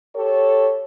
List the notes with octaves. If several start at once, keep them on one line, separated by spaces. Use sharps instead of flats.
G4 A4 C#5